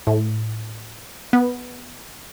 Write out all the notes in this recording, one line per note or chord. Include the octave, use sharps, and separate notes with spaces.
A2
B3